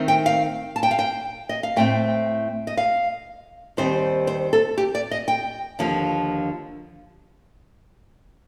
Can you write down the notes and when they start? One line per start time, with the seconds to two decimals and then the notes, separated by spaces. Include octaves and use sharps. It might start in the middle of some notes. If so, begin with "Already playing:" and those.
Already playing: D#3 A3 C4
0.08 G5
0.26 F5
0.76 A5
0.83 G5
0.91 F5
0.99 G5
1.49 D#5
1.63 F5
1.76 A2 A3 C4 G5
2.67 D#5
2.77 F5
3.77 D#2 D#3 G3 C4 C5
4.27 C5
4.53 A4
4.78 G4
4.95 D5
5.11 D#5
5.28 G5
5.79 D#2 D3 F3